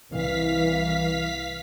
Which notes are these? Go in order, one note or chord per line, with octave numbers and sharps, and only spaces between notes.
C2 E3 F5 B6